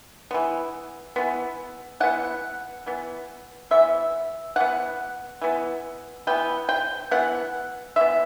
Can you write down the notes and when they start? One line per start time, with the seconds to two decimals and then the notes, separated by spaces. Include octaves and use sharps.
0.31 E3 B3
1.16 E3 B3
2.00 E3 B3 F#5
2.86 E3 B3
3.71 E3 B3 E5
4.56 E3 B3 F#5
5.41 E3 B3
6.27 E3 B3 G5
6.69 G5
7.11 E3 B3 F#5
7.96 E3 B3 E5